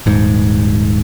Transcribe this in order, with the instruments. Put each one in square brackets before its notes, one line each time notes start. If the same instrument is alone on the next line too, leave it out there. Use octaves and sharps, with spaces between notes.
[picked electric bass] D#1 G#2